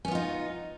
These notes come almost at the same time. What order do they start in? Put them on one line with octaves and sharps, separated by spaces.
C#4 B3 F4 D#4